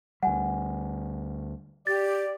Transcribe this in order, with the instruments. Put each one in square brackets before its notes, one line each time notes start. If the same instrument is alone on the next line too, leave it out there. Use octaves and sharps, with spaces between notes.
[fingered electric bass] D2 G3 [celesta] F#5 G#5
[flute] G4 [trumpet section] D5 [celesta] A6